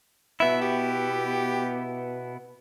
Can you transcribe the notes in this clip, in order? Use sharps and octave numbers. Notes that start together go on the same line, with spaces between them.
B2 B3 E4 E5
G4